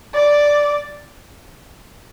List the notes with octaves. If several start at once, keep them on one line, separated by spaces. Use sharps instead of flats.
D5